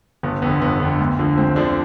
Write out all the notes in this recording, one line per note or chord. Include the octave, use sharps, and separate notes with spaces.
G1 B3
F2 D3 B3
G1 B3
F2 D3
D2
D3 F3
D2 C4
D3 F3 D4